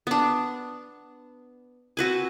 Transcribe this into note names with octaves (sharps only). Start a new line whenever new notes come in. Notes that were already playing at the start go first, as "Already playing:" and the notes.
B3 D4
C4 F#4 B4 G#5